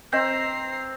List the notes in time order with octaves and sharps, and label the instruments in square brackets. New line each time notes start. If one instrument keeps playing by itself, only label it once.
[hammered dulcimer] C4 [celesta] D#5 G6 [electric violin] A#5 C7